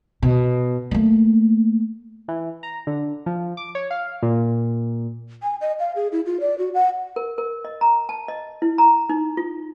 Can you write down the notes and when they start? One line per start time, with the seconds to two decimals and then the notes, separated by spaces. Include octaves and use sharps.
0.22 B2
0.91 A3 A#3
2.28 E3
2.63 A#5
2.87 D3
3.26 F3
3.57 D6
3.75 C#5
3.91 F5
4.22 A#2
5.43 G#5
5.61 D#5
5.79 F5
5.96 G#4
6.12 E4
6.26 F4
6.41 D5
6.58 F#4
6.74 F#5
7.16 A#4
7.38 A#4
7.65 D#5
7.81 A#5
8.09 A5
8.28 D#5
8.62 E4
8.78 A#5
9.09 D#4
9.37 F4